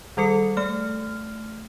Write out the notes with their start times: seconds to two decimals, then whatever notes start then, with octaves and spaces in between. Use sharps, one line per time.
0.17 D#3 G3 A4 C#7
0.57 A3 F6